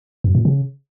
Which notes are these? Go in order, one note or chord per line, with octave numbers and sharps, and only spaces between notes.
F#2
A#2
C#3